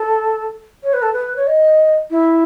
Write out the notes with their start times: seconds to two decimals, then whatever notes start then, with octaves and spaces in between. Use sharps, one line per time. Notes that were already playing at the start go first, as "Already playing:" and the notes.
Already playing: A4
0.83 C#5
0.93 B4
1.02 A4
1.13 B4
1.36 C#5
1.47 D#5
2.10 E4